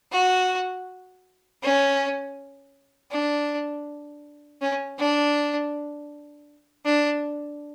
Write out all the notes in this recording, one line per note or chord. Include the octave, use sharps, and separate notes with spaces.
F#4
C#4
D4
C#4
D4
D4